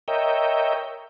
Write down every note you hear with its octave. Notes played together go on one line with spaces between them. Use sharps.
A#4 C#5 D#5 E5 G5